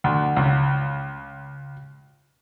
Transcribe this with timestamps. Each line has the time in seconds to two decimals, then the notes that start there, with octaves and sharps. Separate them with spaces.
0.04 D2
0.36 C#2